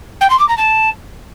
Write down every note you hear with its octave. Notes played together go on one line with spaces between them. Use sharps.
G5
C6
D6
A#5
A5